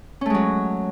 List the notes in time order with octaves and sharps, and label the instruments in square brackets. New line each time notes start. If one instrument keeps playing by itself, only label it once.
[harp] C#4
A3
G#3
F#3